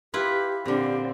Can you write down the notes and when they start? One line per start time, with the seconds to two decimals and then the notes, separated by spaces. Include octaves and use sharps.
0.14 E4 F4 G4 B4
0.66 A#2 D3 C4 G4